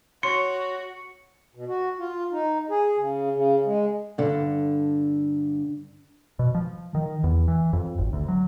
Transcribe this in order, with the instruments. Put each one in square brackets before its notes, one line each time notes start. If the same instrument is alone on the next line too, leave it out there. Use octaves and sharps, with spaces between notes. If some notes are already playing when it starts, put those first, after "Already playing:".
[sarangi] F#4 [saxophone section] C#5 [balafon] C6 [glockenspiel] C#7
[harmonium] B2
F#4
F4
D#4
G#4
C#3
C#3
G#3
[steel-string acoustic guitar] G2 D3
[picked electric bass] B2
F3
D#3
E2
E3
F2
G#1
D2
F#3